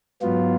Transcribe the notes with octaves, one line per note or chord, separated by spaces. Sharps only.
G#2 F#3 B3 F4